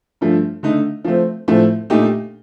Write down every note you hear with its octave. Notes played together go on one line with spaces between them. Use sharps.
G2 F3 A3
D3 A3 D#4
F3 A3 C4
A2 F3 A3 C4
A#2 A3 D#4 G4